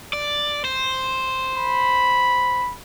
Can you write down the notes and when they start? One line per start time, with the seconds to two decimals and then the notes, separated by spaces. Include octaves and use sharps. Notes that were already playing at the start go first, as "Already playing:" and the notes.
0.13 D5
0.65 C5
1.55 B5